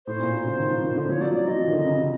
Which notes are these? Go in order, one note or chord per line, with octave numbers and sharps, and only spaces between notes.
A2 C5
A#2
B2
C#3
D#3
F3
D#3
D3
F3 C#5
F#3 D5
F#3 D5
F3 D#5
E3
D#3
D3
C#3
C3